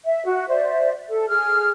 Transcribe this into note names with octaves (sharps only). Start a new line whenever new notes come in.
E5
F#4
C5 D5 E5
A4
G#4 F6